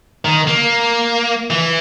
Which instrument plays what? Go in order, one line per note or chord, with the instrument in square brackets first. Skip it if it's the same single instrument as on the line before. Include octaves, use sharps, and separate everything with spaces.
[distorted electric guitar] D#3
A#3
E3